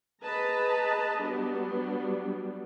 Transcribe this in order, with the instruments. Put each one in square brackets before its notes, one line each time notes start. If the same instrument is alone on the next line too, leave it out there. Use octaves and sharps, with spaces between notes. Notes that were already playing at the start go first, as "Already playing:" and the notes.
[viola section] G#4 B4 D#5 A5 A#5
F#3 G3 B3 D4